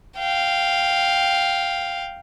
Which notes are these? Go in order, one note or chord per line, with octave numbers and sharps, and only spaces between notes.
F5 G5